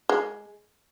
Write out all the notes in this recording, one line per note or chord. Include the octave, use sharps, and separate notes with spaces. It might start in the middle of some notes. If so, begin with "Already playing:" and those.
G#3